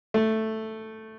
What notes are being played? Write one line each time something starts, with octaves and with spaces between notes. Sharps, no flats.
A3